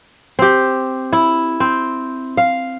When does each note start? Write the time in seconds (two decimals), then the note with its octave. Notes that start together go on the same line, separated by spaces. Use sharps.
0.39 C4 G4
1.13 E4
1.60 C4
2.37 F5